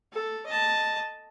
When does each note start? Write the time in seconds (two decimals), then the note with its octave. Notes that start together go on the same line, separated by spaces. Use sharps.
0.12 A4
0.46 D#5 A5